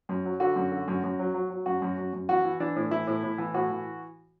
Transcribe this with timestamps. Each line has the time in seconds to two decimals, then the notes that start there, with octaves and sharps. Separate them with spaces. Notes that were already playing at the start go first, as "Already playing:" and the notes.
0.09 F#2
0.26 F#3
0.40 D3 F#4
0.56 F#2
0.72 D3
0.88 F#2
1.04 F#2
1.19 F#3
1.34 F#3
1.50 F#3
1.66 F#2 F#4
1.82 F#2
1.98 F#2
2.13 F#2
2.29 E3 F#4
2.44 E3
2.60 E3 D4
2.76 A2
2.91 E3 E4
3.07 A2
3.23 A2
3.38 E3
3.54 A2 F#4
3.70 E3